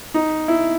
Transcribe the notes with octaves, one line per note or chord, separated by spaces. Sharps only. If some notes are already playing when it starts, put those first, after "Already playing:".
D#4
E4